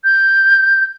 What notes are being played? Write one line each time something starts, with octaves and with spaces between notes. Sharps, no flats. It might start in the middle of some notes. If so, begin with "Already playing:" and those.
G6